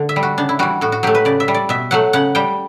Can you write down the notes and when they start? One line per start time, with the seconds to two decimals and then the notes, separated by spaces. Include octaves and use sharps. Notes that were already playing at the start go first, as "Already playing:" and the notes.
Already playing: D3 A3
0.09 E5
0.16 G3
0.23 F#4
0.38 C#3 D4
0.49 E4
0.59 E3 G3 F#4
0.81 A2 F#4
0.92 F#4
1.03 F#3 A3 G4
1.15 B4
1.25 C#3 D5
1.40 E5
1.48 G3
1.54 D5
1.69 B2 E5
1.91 F#3 A3 F#5
2.13 C#3 F#5
2.35 G3 G5